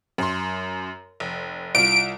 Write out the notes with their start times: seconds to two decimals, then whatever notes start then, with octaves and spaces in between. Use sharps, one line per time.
0.18 F#2 C6
1.20 F1
1.75 C2 F4 D7